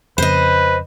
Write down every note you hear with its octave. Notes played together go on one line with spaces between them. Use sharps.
F2 C#3 B4 C5 D#5